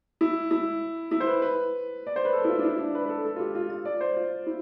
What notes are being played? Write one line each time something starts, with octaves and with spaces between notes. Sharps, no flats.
E4
E4
E4
C5
B4
B4
D5
C5
B4
A4
E4
F4
D4
E4
D4
B4
B4
A4
A4
F4
G4
F4
F4
D5
C5
F4
E4